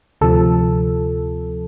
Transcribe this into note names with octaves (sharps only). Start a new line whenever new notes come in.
D2 C3 F3 A4